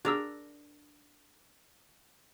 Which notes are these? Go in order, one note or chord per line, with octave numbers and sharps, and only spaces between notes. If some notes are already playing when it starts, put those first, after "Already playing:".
D4 F#4 G#4 A#4 E6